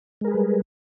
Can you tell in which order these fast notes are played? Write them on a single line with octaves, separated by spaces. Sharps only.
G#3 A#4 G#4 B4 G3